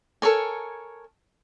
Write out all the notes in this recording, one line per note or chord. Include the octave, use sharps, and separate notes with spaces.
A4 A#4 C#5 G#5